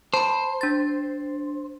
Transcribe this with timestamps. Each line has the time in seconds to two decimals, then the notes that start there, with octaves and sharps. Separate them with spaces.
0.14 C5 A5 B5
0.61 D4 A6